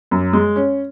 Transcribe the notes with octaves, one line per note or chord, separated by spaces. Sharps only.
F#2
G#3
C#4